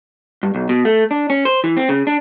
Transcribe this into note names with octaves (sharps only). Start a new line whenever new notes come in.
G2
B1
B2
A3
D4
C#4
C5
E3
C4
C#3
D4